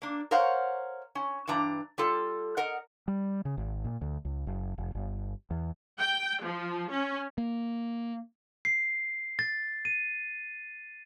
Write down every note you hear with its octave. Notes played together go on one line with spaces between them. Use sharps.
A#3 D4
A#4 C5 C#5 F5 F#5
C#4
G2 E3 D4 A#5
G3 F4 A4
A#4 D#5 F#5
G3
C#3
G#1
A#2
D2
C#2
F#1
F1
G1
E2
G5
F3
C#4
A#3
C7
A6
D#7